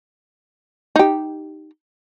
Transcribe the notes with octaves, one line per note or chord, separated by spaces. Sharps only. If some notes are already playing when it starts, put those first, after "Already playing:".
D#4 G4